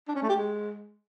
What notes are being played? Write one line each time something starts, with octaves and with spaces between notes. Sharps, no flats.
D4
C#4
A3
G4
G#3